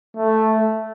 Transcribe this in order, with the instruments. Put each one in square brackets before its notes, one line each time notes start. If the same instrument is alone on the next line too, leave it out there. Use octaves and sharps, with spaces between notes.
[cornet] A3